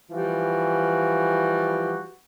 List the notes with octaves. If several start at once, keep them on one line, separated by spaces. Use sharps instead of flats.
E3 F3 G3 F#4